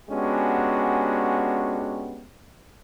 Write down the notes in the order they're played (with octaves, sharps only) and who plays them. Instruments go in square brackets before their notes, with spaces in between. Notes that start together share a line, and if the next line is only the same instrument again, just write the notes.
[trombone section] G#3 B3 C#4 D4 F#4 G4